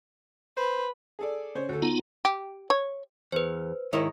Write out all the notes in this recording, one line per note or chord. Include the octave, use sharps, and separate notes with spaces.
B4 C5
G#4 A4 D5
C#3 C5 C#5
D2 A4
B3 D#4 F4 A#5
G4
C#5
E2 B4 C5
G#2 D#3 E4 A#4 C#5 D#5